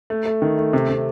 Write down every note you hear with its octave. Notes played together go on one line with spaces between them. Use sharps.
A3
A3
D#3
A3
C3
C3